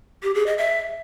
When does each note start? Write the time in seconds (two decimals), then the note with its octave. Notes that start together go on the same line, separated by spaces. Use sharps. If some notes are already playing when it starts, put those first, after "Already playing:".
0.23 G4
0.35 G#4
0.46 D#5
0.58 E5